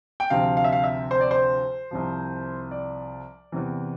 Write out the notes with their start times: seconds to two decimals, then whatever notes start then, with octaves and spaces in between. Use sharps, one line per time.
0.20 G5
0.30 D2 C3 F3 F5
0.57 F5
0.64 E5
0.72 F5
0.84 E5
1.11 C5
1.21 D5
1.31 C5
1.91 C2 C3 F3
2.71 D5
3.52 E2 C3 E3